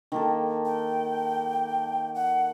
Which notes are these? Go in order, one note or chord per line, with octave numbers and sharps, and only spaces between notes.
D#3 A#3 A4
G5
F#5